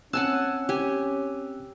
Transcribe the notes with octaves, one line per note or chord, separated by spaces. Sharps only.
C4 C#4 F#5 G#5 A5 E6 F#6
G4 G#5